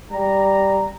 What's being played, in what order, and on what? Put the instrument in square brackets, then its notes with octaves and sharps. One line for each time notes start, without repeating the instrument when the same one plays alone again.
[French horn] G3 [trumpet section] A#5